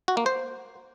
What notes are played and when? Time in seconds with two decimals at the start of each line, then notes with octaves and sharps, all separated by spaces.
0.08 F#4
0.17 A#3
0.26 C5